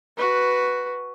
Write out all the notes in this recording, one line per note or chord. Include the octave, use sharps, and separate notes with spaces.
F#4 B4